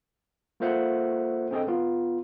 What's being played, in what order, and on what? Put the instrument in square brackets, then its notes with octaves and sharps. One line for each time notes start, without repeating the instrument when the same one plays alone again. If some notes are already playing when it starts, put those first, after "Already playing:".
[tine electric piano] A#3 F4 A4 C5 E5 F#5
C4 D4 G#4 A4 D#5 G5
B3 F4